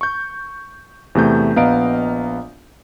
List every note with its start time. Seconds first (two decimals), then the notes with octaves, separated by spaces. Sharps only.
0.01 C#6 G6
1.15 E2 C3 A3 G6
1.56 A#1 B3 D#5 F5 A#5 D7